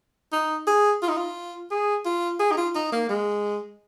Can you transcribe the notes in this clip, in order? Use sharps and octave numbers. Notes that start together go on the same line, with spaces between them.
D#4
G#4
F4
D#4
F4
G#4
F4
G#4
D#4
F4
D#4
A#3
G#3